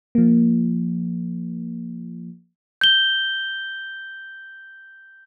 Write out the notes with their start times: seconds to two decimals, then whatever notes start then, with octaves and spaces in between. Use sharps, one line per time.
0.15 F3 A#3
2.81 G6 G7